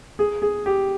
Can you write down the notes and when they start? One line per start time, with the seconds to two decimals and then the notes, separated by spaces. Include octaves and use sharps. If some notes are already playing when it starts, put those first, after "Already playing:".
0.19 G#4
0.42 G#4
0.66 G4